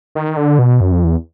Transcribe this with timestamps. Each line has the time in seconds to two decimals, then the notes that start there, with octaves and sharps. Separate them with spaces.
0.15 D#3
0.37 D3
0.59 B2
0.81 F#2
0.92 F2
1.04 E2